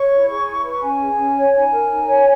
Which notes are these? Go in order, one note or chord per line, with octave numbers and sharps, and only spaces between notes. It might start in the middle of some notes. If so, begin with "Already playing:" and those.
Already playing: C#5 C#6
E4
G#4
E4
B4
C#4 G#5
G#4
C#4
C#5
D#4 G#5
A#4
D#4
C#5